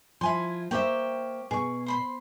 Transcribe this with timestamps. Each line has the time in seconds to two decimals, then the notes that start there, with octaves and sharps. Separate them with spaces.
0.21 F3 E4 G#5 C6
0.71 A#3 G4 C5 C#5 E5 G5
1.51 B2 G#4 C#6
1.86 C5 B5 C6